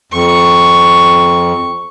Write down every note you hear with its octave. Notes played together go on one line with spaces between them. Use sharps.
F2 C#6